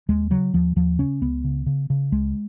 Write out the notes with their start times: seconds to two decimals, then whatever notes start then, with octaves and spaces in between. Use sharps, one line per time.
0.09 D#2 G#3
0.30 C#3 F#3
0.53 D#2 F3
0.76 D#2 F3
0.99 C#3 C#4
1.21 C#2 B3
1.44 C#3
1.66 C#3
1.90 C#3
2.12 C#2 G#3